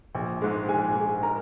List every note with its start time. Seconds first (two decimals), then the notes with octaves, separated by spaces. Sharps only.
0.15 A#1
0.42 G#2 G#3
0.69 A#1 G#4 G#5
0.95 G#2
1.01 G#3
1.23 A#4 A#5